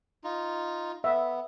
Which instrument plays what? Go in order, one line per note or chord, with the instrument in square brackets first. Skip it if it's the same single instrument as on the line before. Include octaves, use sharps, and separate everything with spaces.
[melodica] D#4 F4
[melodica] B3 [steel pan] E5